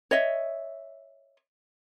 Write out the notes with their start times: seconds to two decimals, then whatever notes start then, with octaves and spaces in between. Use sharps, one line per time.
0.11 C#5 D#5 E5